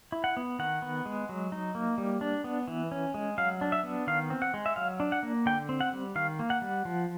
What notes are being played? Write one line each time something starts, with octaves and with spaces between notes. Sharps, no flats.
E4
F#5
B3
D#3 F#5
B3
G#3
F#3
D#4
A#3
G3
D4
B3
E3
C#4
G#3
F#3 F5
D4
E5
B3
D#3 F5
C4
F#5
G#3
E5
F#3 F5
D4
F#5
A#3
D3 G5
C4
F#5
G3
D#3 F5
A#3
F#5
G3
F3